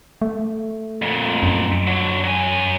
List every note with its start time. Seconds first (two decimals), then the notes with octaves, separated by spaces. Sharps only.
0.22 A3
1.02 F2 A#2
1.43 F#2
1.87 D3 F#3
2.24 F#3 G#5